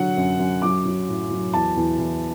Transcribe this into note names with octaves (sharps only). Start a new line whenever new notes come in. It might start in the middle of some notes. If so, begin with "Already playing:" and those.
Already playing: D3 F#3 F#5
F#2
F#2
F#3 D6
F#3
A2
F#3
E2 A5
E2
E2